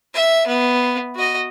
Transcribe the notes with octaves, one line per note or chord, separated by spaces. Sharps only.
E5
B3
F#4 D#5